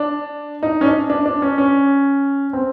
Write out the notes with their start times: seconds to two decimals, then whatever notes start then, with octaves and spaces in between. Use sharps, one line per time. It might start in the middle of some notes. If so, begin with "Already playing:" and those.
Already playing: D4
0.63 D#4
0.81 C#4
0.86 D4
1.10 D4
1.26 D4
1.42 C#4
1.58 C#4
2.53 C4